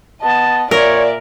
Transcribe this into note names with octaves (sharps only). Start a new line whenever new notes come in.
B3 D#5 A5
A#2 A#4 C#5 D5 E5